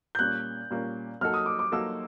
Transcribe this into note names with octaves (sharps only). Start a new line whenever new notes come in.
G6
A#2 G3 A#3 C#4 F#6
A#2 G3 A#3 C#4
F#3 A#3 D#4 F#4 A4 F6
D#6
D6
D6
F#3 A#3 D#4 F#4 A4 E6